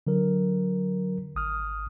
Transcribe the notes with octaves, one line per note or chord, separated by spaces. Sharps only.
D3 F#3 A#4
G#1 D#6 F6